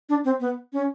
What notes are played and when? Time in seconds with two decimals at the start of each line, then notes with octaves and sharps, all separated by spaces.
0.09 D4
0.25 C4
0.40 B3
0.73 C#4